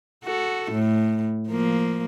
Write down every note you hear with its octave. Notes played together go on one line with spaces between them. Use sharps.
F#4 A4
A2
F3 A#3